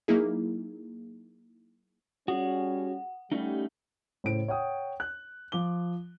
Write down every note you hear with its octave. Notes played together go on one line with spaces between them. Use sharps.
F#3 A#3 D#4 E4 G#4
G3 C#4 F#4 G#4 F#5
G3 A3 C#4 D#4
A2 C#3 E4 C5 D7
C#5 F#5 G5 D#6
F#6
F3 F4 D6 G7